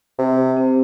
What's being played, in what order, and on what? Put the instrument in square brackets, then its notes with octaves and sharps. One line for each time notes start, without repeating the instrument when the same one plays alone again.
[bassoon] C3 [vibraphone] C4
[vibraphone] G4
C4